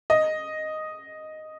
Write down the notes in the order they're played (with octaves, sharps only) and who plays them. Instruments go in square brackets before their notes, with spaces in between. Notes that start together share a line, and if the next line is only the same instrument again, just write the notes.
[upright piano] D#5